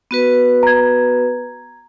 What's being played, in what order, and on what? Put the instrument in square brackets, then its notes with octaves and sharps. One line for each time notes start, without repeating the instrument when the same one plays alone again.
[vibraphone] B3 F#4 B4
[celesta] A#5 G#6